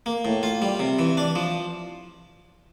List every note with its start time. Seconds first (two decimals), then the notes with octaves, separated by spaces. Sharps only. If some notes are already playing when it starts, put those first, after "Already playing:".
0.06 A#3
0.25 A2
0.43 F4
0.62 G3
0.80 C3
0.99 E3
1.17 D4
1.35 F3